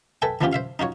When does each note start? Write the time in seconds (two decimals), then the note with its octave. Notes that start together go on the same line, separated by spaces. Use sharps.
0.22 A4 B4 E5 G5 G#5
0.41 E3 F3 B3 C#4 F4 G4
0.53 C5 E5 F5
0.79 D#4 F4 F#4 C#5